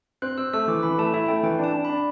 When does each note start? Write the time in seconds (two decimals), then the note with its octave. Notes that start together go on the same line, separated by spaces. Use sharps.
0.22 C4 F#6
0.38 C4 E6
0.53 A3 E6
0.68 E3 D6
0.83 E3 B5
0.99 A3 A5
1.13 E4 E5
1.28 A3 G5
1.43 E3 G5
1.59 D4 A5
1.74 D4
1.85 D4 B5